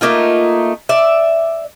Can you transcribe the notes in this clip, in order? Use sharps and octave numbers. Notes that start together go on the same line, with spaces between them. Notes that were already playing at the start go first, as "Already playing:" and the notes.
A3 A#3 D#4 F4
D5 E5